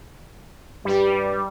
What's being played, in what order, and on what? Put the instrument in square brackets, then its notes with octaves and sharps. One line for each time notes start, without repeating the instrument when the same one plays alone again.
[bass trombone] G2 [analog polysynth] G3